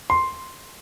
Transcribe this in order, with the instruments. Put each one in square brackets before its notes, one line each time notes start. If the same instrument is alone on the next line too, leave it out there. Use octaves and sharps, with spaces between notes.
[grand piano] C6